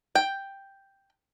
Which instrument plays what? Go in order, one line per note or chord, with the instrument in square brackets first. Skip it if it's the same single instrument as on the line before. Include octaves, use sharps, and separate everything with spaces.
[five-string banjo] G5